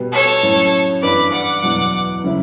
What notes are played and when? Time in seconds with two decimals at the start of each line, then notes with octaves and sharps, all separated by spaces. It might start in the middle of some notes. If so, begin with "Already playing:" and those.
Already playing: B2 G3 B3 F#4
0.13 A4 C#5
0.43 A2 F#3 C#4
1.02 G2 E3 B3 B4 D5
1.32 D5 F#5
1.63 E2 B2 F#3
2.24 C#3 F#3 C#4 E4